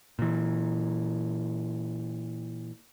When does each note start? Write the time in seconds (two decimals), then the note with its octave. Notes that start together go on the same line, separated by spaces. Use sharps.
0.19 A#2 E3